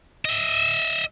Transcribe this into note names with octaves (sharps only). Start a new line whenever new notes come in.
D#5 E5